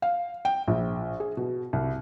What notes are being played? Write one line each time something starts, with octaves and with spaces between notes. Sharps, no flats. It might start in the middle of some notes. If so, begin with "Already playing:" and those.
F5
G5
A#1
G#4
B2
C2